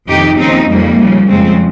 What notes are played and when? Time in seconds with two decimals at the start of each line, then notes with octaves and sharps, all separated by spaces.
0.08 F2 C3 D#3 D#4 G4
0.38 D#2 C#3 F3 C4 D#4
0.68 F2 C#3 F3 G3 A#3
0.98 D#2 C#3 F3
1.28 F2 C#3 F3 G#3 C4